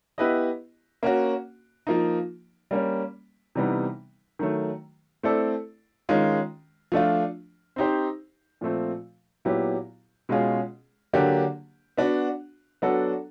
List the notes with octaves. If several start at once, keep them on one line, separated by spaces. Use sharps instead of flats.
B3 E4 G4 B4 D#5
A#3 C#4 F#4
F3 A#3 D#4
G3 A#3 C#4
C3 E3 G3 B3 D#4
D#3 F#3 A3
A3 C4 E4 A4 D5
D#3 G#3 C#4 F4
F3 A3 D4 F4
C4 D#4 G4 C5
A#2 F3 A3 C4
A#2 F#3 B3 E4 G4
B2 G#3 C#4 F4 G#4
D3 F#3 A#3 D4 G4
B3 D4 F#4
F#3 B3 D4 F#4 A4